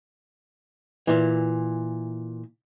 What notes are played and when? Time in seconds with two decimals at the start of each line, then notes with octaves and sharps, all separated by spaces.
1.07 A#2 E3